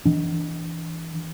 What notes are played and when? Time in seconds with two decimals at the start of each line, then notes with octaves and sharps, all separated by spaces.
0.06 E3 D4